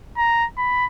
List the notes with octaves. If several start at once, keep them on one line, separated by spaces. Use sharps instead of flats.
A#5
B5